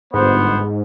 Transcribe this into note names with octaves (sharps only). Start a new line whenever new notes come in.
G1 G#2 B3 C5